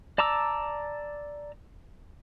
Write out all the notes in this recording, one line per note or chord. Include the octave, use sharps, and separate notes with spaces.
D5 A5 A#5 D6 E6